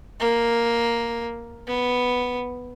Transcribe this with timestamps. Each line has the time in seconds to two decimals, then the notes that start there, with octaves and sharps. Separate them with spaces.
0.20 A#3
1.67 B3